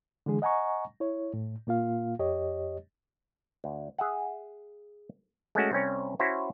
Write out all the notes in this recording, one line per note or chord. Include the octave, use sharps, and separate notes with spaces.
D3 E3 G#3 G#4
D#5 F#5 G#5 A#5 C#6
E4 C#5
A2
A#2 A#3 F4 F5
F2 G4 C#5 D#5
D2
G#4 E5 F#5
G#3 A3 C#4 F#4
C2 C4 C#4 C#5
C#4 E4 F#4 C5 C#5